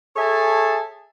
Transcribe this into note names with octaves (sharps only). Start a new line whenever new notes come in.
G#4 A4 C#5 E5 G#5 A5